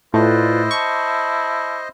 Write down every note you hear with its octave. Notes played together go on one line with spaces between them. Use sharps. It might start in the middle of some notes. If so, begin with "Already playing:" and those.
A2 A3 E4 F4 B4 C5 D5 D#5
A5 C#6